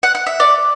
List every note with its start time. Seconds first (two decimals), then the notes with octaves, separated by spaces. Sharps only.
0.03 F#5
0.15 F#5
0.27 E5
0.40 D5